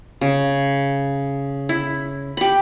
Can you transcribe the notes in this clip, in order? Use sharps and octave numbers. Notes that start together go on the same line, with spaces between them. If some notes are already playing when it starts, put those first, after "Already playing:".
C#3
E4
G4 B5